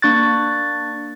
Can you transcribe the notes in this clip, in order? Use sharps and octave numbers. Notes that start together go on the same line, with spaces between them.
A#3 D4 C#6 F#6 A6